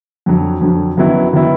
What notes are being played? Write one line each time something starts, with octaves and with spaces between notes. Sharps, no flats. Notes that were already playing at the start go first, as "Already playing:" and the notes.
F2 D3 F#3
F2 D3 F#3
F#2 D#3 F#3 B3 E4
D#3 F#3 B3 E4